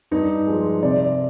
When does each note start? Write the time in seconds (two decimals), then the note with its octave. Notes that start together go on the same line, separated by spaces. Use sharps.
0.11 G2 D#4
0.47 F3 G#3
0.83 C3 D5